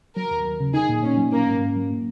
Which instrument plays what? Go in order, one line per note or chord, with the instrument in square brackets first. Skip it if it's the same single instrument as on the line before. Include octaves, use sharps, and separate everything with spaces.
[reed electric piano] F#3 [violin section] A#4
[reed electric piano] D#2
D#2
C#3
[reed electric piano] D#4 [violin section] G#4
[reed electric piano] A#2
[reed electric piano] A#2 [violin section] C#4
[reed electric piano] F#3
[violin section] A#3 [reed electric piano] C#4
[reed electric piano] G#2
G#2
F#3
A#3